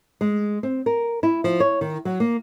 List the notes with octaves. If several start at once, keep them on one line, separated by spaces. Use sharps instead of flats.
G#3
C4
A#4
E4
F3
C#5
D#3
F#3
A#3